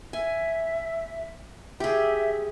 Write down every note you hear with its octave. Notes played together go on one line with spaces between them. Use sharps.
E5 G#5
G4 G#4 E5